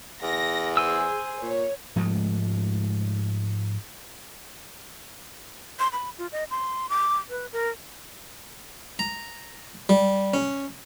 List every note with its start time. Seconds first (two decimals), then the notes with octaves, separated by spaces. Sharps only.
0.22 E2 A#6
0.77 G#4 C5 G#5 E6
1.42 A#2 C#5
1.96 G#2 F3 G#3 A3
5.79 C6
5.93 B5
6.19 F4
6.32 D#5
6.51 C6
6.90 D6
7.30 B4
7.52 A#4
8.99 A#5
9.89 G3
10.34 C#4